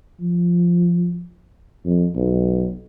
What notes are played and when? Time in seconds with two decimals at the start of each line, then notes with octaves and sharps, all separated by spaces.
0.21 F3
1.85 F2
2.15 B1